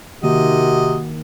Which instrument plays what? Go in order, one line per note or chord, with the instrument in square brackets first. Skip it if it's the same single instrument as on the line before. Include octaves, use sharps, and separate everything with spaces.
[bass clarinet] C3 [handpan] D#3 A#3 [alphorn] F#4 [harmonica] D#5